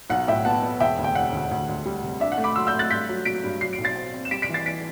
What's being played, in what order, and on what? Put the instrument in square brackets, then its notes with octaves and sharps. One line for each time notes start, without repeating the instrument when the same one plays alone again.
[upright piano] B1 F#5
A2 E5 G5
B3 F#5 A5
B3
E1 E5 G5
D2
G5
E1 F#5
D2
D2
D2
G3
C3
D4 E5
F#5
A3
B5 D6
F#3 C6 E6
E6 G6
A3
F#6 A6
G2 G6 B6
F#3
F#3 B6 D7
G2
F#3 C7
D7
B1
A6 C7
C4
C4
E7
G3 B6 D7
B6 D7
E3
A6 C7
E3 B6 D7